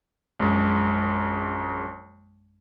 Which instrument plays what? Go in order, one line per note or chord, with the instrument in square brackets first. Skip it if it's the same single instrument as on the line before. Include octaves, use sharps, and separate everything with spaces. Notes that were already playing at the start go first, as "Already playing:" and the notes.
[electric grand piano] A#1 F#2 G#3